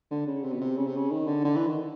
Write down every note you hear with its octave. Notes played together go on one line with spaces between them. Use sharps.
D3
C#3
C3
B2
C3
C#3
C3
C#3
D#3
D3
D3
E3
D#3